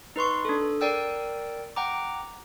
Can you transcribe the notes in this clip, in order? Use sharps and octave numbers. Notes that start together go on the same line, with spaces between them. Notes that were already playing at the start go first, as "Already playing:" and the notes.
D#4 B4 C6 C#6
D4 A4
A#4 D5 G5 E6
F#5 G5 A#5 D6